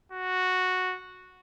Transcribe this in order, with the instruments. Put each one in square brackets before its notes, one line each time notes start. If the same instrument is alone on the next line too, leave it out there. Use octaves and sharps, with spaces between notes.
[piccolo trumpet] F#4